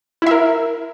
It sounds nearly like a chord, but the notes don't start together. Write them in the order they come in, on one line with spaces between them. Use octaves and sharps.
E4 E5 A#4